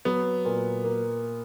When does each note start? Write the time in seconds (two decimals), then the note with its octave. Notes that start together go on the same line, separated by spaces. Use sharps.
0.05 F#3 B3
0.45 A#2
0.84 A#3